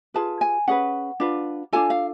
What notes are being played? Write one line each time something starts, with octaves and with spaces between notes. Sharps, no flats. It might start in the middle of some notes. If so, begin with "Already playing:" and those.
F4 G#4 B4 A5
G#5
C#4 G#4 B4 F#5
D4 F4 B4
D4 F4 A4 G#5
F5